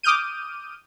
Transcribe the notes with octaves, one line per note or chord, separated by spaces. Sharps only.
D6 D#6 F6 G6 D#7